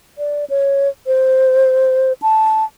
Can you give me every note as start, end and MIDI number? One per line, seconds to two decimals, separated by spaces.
0.18 0.45 74
0.50 0.89 73
1.07 2.13 72
2.22 2.64 81